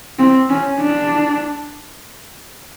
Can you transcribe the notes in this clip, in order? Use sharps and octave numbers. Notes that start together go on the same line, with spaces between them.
C4
C#4
D4